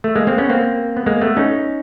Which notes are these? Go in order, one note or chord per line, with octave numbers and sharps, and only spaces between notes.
A3
G#3 A#3
A#3 C4
B3 C#4
A#3 C4
B3
G#3 A#3
A3 B3
C#4 D#4